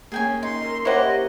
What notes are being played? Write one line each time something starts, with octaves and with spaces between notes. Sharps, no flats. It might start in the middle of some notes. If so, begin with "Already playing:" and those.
A#3 C#4 G#4 G5 G#5
D#4 C6
A#4 E6
E4 G4 A#4 C5 C#5 D#5 F#5